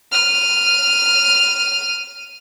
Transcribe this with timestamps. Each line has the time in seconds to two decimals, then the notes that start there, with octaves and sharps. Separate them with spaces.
0.12 F6 D#7